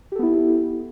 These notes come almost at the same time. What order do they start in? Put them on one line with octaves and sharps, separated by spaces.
G4 A4 B3 E4